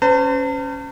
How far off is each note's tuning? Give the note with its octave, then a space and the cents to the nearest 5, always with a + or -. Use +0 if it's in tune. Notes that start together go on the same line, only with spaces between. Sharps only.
C#4 +0 C5 -45 A5 +45